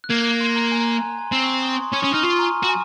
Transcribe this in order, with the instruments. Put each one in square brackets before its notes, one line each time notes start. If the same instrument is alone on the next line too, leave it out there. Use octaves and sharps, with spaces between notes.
[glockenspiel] F#6
[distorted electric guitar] A#3 [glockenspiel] G#6
[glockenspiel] F#6
G#6
C6
A#5
G#5
A#5
A#5
G#5
A#5
G#5
C6
[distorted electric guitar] C4 [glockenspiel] A#5
[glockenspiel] C#6
C6
D#6
C#6
C6
[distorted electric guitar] C#4 [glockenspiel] C#6
[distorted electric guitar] C#4 [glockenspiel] D#6
[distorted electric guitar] D#4 [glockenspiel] F6
[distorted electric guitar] F4 [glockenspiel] C#6
[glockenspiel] C6
A#5
G#5
A#5
[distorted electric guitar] F#4
[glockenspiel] G#5